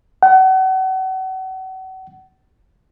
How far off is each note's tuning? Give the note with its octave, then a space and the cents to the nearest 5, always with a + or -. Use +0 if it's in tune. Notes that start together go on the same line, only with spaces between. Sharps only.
F#5 +35